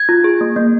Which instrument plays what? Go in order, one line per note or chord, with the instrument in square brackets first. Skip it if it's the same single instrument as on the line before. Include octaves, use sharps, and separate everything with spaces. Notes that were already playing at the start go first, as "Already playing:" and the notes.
Already playing: [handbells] G#6
F4
G#4
A#3
A#3